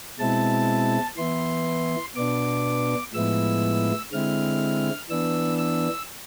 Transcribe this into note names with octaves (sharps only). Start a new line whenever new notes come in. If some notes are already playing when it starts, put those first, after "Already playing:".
B2 G#3 C4 E4 A5
E3 B3 E4 C6
B2 B3 D4 D6
A2 F3 G#3 B3 E4 E6
D3 G#3 C4 E4 F6
E3 B3 D4 E6
E6